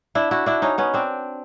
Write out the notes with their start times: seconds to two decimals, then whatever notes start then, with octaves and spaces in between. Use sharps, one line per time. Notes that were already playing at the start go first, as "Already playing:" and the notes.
0.15 D4 E4
0.31 E4 F#4
0.46 D4 E4
0.62 C#4 D#4
0.78 B3 C#4
0.94 C4 D4